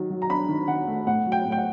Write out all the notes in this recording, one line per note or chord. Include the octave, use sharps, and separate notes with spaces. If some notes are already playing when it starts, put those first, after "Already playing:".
Already playing: D#3 F#3
F#3
A#5
D4 B5
D#3
D#3 F#5
A3
A2 F#5
F#3
G5
A2
G5
F#5